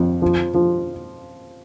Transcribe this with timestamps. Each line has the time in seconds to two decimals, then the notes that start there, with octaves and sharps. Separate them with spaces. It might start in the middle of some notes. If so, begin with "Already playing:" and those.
Already playing: F2
0.22 F3
0.54 F3